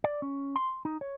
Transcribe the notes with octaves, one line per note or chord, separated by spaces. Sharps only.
D5
C#4
C6
D#4
C#5